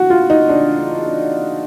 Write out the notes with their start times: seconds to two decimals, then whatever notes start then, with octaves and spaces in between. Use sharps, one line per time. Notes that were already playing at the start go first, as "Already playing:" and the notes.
Already playing: E3 F#4
0.10 F4
0.30 D#4
0.49 D4